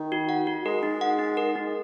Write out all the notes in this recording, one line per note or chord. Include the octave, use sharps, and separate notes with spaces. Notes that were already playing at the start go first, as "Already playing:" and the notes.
Already playing: D#3
F#4
F#5
F#4
G#3 A#4
D#4
F#5
D#4
A#4
D#4